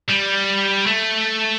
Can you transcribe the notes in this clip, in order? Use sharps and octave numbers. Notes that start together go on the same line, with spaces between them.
G3
A3